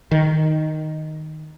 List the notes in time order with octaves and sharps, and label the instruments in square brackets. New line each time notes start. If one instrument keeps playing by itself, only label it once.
[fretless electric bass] D#3